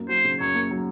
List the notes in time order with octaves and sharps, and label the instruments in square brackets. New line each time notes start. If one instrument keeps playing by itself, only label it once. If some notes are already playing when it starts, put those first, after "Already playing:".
Already playing: [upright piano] F#2 A#3
[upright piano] F#3 [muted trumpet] C5
[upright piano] C#3
[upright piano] F#2 [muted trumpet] C#5
[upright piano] A#3
F#3